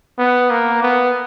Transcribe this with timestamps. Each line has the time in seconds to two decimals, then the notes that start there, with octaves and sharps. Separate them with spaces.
0.19 B3
0.50 A#3
0.83 B3